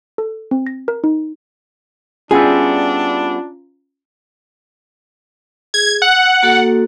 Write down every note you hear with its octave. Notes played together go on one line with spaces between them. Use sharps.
A4
C4
A#6
A#4
D#4
G3 B3 C#4 D4 E4 F4 G#4 A#5
G#4 G#6
F#5 E6
A#3 F#4 A4